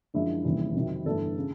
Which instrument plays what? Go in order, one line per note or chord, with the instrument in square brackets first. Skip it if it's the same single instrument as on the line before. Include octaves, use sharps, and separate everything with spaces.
[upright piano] F#2 D3 F3 G#3 E4
F1 D#2 C#3 E3 G3
F2 C3 D#3 F#3
G1 G2 E3 A3 A4
C#3